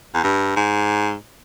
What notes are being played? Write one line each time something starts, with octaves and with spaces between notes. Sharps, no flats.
E2
G2
G#2